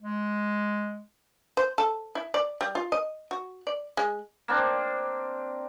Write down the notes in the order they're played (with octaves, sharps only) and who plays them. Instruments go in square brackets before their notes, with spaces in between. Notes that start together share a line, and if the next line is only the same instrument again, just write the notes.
[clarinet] G#3
[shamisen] C5
A4
E4
D5
G3
F4
D#5
F#4
D5
G#3
[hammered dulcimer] A#3 C4 D4